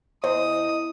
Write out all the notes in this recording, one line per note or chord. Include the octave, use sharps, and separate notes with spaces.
E2 C5 D#5 D#6